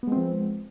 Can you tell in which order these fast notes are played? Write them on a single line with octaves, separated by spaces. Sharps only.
B3 G#3 C4 F3